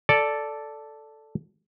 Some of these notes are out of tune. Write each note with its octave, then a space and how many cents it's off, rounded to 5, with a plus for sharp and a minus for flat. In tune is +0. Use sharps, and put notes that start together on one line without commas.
A4 +0 D5 -5